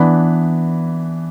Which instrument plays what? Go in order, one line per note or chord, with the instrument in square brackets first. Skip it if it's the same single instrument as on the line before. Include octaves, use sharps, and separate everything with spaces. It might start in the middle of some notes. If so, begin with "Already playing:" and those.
Already playing: [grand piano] E3 B3 D4 B5